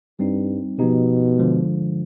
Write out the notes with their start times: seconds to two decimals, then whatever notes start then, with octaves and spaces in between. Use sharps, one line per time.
0.19 G2 G3 C4 D#4
0.78 B2 F3 B3 D#4 G4
1.38 D3 F3 G#3